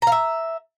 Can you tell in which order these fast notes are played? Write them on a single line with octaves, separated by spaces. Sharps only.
A#5 F5 E5